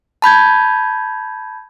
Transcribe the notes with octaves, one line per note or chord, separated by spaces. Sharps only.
A5 B5 G6 G#6